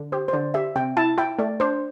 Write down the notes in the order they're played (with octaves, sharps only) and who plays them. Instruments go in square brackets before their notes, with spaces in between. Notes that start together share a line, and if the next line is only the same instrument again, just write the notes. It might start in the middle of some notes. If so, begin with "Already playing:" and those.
Already playing: [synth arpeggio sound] D3
[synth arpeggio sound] G4 [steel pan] C5
[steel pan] C5
[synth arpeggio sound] D3 [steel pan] D5
[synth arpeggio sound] G4 [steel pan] E5
[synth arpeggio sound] C3 [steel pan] G5
[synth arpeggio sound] E4 [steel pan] A5
[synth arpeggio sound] E4 [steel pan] G5
[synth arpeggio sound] A3 [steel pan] D5
[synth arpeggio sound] D4 [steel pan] C5